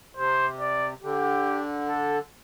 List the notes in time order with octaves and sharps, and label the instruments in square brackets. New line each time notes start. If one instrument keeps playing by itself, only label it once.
[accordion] C3 [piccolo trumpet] C5
[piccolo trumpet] D5
[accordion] D3 [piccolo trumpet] G4
[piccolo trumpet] A4